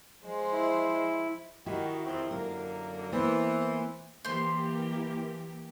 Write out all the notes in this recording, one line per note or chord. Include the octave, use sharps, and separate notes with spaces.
F3 G#3 C5
E4
D#3 E4 F#4 G4
F2 D#3 C4
F#2 D3 A#3 A#4
E3 A#3 B3 E4 C5
E3 A#3 G4 C5 C6